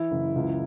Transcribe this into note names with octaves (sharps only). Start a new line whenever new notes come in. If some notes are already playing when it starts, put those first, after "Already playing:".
Already playing: E3 E4
F#1
C#2